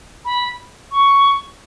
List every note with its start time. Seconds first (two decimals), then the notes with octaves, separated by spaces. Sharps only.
0.25 B5
0.91 C#6